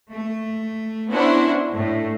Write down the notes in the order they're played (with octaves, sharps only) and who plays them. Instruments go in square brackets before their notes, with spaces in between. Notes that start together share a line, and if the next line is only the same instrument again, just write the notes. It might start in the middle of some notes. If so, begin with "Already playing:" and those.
[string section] A3
B3 C#4 D4 E4 F#4 C5
A2 A3